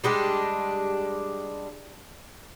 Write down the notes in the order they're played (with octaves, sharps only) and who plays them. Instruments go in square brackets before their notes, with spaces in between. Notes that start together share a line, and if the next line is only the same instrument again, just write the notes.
[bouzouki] G3 G#3 D4 G4